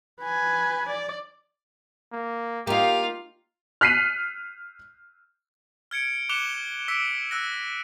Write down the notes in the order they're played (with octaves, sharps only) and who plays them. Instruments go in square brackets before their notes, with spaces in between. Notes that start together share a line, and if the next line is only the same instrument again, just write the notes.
[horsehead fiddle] B4 G#5
D5
[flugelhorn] A#3
[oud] A#3 D#4 [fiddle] F4 F5 [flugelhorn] G4
[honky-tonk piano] F6 F#6 B6 C7 D#7
[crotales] F6 G#6 C#7 D7
D6 F#6 C#7 E7 F7 G7
D6 E6 B6 D7
E6 F#6 A#6